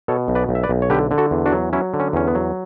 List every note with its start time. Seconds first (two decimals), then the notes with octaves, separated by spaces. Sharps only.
0.08 B2 A4 C#5
0.28 B1
0.35 B4 D5
0.49 B1
0.55 E5
0.63 B4 D5
0.69 B1
0.82 C#5
0.90 D3 G4 B4
1.11 D3
1.18 F#4 A4
1.31 E2
1.46 D4 F#4
1.52 F#3
1.73 F#3 C#4 E4
1.94 D3
2.00 C#4
2.13 E2 C#4
2.28 B3
2.35 F#3